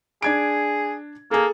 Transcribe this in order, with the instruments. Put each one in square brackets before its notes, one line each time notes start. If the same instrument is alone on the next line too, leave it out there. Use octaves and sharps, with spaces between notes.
[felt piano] D4 G#6 D7 [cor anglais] G#4
[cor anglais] A#3 [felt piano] G#4 A4